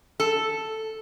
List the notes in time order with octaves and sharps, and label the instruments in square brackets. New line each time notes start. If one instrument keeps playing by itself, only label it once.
[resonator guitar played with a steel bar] A4